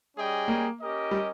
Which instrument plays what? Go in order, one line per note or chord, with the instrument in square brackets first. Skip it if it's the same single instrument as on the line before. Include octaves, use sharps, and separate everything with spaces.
[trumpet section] G3 C#4 G#4 D#5 G5
[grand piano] A#3
[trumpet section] C#4 G4 A#4 D#5
[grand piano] G3